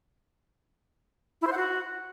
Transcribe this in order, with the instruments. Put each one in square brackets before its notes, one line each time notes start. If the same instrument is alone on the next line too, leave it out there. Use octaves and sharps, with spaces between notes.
[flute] E4
C5
F#5
F#4